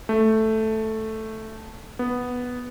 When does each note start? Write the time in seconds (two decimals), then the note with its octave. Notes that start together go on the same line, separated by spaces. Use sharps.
0.09 A3
1.99 B3